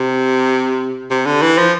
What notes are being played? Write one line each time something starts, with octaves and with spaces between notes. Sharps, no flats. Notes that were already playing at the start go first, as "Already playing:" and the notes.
Already playing: C3
C3
D3
E3
F3